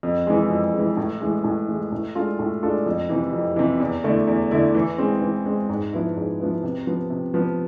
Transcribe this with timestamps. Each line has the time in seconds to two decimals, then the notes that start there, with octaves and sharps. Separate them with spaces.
0.03 F2
0.27 E3 G#3
0.50 F2
0.74 E3 G#3
0.97 A2
1.21 E3 G#3
1.44 A2
1.68 E3 G#3
1.92 A2
2.15 G#3 D4 F4 A4
2.39 A2
2.63 G#3 D4 F4 A4
2.86 F2
3.10 C3 E3
3.33 F2
3.56 C3 E3
3.80 E2
4.04 D3 A3 E4
4.27 E2
4.51 D3 A3 E4
4.74 E3
4.98 G#3 C4
5.22 E3
5.46 G#3 C4
5.69 G#2
5.93 F3 B3 E4
6.17 G#2
6.40 F3 B3 E4
6.63 C3
6.87 F3 B3
7.10 C3
7.34 F3 B3